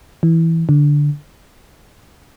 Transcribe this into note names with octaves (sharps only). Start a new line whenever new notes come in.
E3
D3